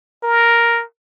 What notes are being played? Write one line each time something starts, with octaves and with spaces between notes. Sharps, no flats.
A#4